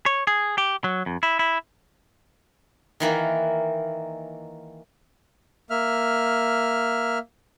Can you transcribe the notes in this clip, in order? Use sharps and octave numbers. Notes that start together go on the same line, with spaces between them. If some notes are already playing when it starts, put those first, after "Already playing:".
C#5
G#4
G4
F#3
F2
E4
E4
D#3 E3 A#3
A#3 E5 F6